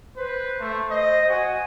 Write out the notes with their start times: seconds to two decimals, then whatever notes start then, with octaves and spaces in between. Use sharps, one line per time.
0.16 B4 C5
0.60 A3
0.91 D#5
1.29 F#4 G#5